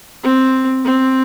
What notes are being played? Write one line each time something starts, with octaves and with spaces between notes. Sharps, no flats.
C4
C4